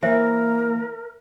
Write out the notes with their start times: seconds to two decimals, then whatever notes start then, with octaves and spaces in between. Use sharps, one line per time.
0.03 E3 A#3 A#4 C5 E5 G#5